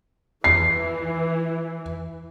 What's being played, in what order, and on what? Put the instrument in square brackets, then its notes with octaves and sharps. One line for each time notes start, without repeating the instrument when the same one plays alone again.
[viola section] E3 [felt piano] C7